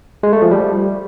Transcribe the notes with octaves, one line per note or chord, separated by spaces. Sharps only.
G#3
A3
F3
G3